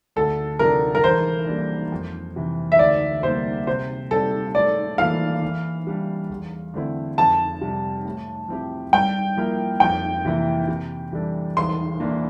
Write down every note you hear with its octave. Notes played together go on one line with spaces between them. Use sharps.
D2 A4
C3 F3 A3 D4 A#4
A#4
E3 C5
G3 A#3 D4
F2
C3 E3
E5
D2 D5
C3 G3 A#3 C5
C3 C5
G3 C4 G4 A4 D5
A2 D5
E3 A#3 F4 A4 F5
E3
G3 D4 G4
E2
D3 A3 C4 E4
F2 A5
C3 G3
A2
F3 C4 E4 G4
G2 G5
F3 A#3 E4 A#4
F2 G5
C3 E3 A#3 E4
C3
E3 G3 D4 A4
E2 C6
E3 A#3 D4